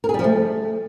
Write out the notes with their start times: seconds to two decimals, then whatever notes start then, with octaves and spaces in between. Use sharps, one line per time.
0.04 A#4
0.09 G#4
0.14 G3
0.19 F3
0.24 A3